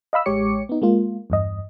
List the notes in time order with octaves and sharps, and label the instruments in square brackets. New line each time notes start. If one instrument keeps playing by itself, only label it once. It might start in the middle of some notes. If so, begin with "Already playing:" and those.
[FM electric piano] D#5 F5 B5 E6
A1 G#3 G4 C#5 D6 C#7
B3 D#4
G#3 A#3 F4
E2 G2 D#5